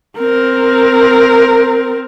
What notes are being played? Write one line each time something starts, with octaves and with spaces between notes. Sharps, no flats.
C4 A#4